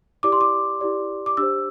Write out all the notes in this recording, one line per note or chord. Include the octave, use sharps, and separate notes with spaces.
E4 G4 D5 D6
C6
D6
E4 G4 D5
D6
D4 G4 C5 E6